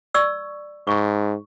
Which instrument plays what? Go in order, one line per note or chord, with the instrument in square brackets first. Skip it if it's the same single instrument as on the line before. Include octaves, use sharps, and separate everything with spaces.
[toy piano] D5 C#6 E6
[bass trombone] G#2 [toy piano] C#6